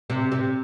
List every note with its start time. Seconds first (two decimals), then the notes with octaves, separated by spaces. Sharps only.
0.10 C3
0.32 C3